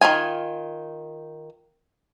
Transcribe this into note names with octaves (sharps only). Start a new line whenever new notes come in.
D#3 F#3 F4 G#5